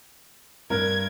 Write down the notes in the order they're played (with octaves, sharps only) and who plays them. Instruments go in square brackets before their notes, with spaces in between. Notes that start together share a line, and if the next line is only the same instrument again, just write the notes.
[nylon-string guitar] G2 [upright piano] A#4 [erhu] G#6